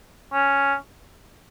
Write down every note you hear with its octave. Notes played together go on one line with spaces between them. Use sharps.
C#4